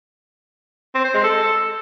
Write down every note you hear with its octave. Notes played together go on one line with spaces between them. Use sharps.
C4
C5
G#3
A4